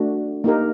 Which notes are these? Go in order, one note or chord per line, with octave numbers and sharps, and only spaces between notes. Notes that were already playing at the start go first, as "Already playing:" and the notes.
Already playing: A3 D4 F#4
A#3 D#4 G4 A#4